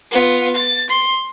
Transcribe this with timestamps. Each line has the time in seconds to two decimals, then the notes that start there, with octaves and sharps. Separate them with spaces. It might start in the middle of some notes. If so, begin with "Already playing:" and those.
0.11 B3 F4
0.56 A6
0.90 C6